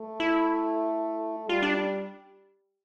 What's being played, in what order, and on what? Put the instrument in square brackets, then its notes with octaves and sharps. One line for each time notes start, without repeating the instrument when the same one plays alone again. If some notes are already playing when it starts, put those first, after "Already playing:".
Already playing: [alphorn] A3
[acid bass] E4
[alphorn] G3 [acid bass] F4
[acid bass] D4